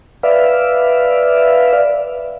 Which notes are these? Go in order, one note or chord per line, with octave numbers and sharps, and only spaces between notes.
B4 D5 E5 F5